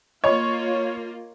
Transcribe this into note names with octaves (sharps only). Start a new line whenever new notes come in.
A#3 F4 C#5 D#5 B5 C#6